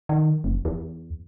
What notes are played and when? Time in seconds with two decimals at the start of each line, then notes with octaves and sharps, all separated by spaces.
0.09 D#3
0.44 F#1
0.65 E2